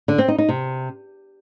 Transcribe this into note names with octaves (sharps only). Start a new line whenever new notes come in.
D3
C4
D#4
D#4
C3